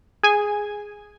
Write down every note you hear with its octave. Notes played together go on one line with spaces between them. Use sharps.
G#4 G#5